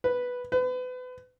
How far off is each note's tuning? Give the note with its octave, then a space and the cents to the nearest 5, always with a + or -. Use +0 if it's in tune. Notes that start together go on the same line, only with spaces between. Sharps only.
B4 +0
B4 +35